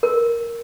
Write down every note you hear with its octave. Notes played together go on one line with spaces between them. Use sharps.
A#4